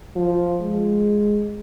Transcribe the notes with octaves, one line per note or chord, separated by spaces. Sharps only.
F3
G#3